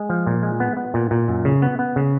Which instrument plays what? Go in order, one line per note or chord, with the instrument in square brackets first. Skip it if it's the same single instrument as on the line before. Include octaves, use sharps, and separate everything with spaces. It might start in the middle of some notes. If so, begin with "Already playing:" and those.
Already playing: [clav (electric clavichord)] G#3
F3
A#2
G#3
B3
B3
A#2
A#2
F#2
C#3
B3
B3
C#3